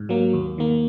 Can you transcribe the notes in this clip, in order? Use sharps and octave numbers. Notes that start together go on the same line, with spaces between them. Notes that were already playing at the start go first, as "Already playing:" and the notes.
Already playing: G#2
F#3 A#3
D#2
D#3 A#3